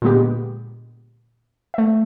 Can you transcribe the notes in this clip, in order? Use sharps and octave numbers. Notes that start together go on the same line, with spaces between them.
A#2 D3 G#3 B3 G4
A3 E5